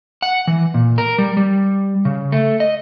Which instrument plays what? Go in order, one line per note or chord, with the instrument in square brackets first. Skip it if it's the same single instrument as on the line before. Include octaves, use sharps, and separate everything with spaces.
[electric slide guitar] F#5
E3
A#2
A#4
G3
G3
C#3
A3
D#5